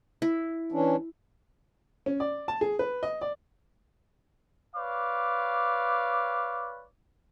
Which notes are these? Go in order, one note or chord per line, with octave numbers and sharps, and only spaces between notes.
E4
E3 C#4 D4
C#4
D5
A5
G#4
B4
D#5
D5
B4 C#5 D5 F5 D6